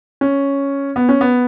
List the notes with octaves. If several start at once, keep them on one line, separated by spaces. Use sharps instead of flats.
C#4
B3
C#4
B3